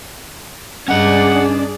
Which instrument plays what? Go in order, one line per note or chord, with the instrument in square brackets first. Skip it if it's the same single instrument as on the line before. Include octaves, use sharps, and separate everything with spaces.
[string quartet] G2 [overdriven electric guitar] C#4 D#5 [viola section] D4 G#4 D5 [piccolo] F#5